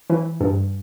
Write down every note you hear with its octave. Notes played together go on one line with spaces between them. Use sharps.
E3
G2